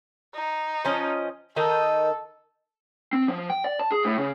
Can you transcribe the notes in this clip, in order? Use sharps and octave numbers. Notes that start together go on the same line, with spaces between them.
D#4
F3 C#4 D#5
D#3 D#4 A4 D#5
C4
F3
G5
D5
A5
G#4
A2
C#3